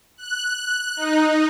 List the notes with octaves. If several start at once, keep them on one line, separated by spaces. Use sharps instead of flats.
F#6
D#4